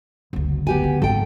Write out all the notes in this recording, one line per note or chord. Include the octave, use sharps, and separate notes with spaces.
F#1 D2
B3 G4 G#5
D3
G#1 A4 G5